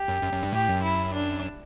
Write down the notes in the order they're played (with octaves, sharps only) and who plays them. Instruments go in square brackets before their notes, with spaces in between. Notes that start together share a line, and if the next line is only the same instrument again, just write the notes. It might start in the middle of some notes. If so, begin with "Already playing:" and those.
Already playing: [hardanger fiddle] G4
[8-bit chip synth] F#2
F#2
F#2
G2
[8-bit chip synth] A2 [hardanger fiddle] G4
[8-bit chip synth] F#2
[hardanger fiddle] E4
D4